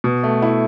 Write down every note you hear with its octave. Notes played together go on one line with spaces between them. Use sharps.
B2
A3
E4